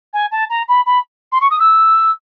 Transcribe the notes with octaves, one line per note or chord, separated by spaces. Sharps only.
G#5
A5
A#5
B5
B5
C6
C#6
D#6
E6